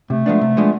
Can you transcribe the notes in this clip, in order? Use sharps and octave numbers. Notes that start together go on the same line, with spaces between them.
C3 A3
F3 G#3 B3 D4
C3
F3 G#3 B3 D4